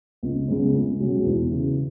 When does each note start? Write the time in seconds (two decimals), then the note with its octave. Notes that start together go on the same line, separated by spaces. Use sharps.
0.23 C#2
0.48 C#3 G#3 B3
0.73 C#2
1.00 B2 G#3 C#4 F#4
1.24 E2
1.50 C#3 E3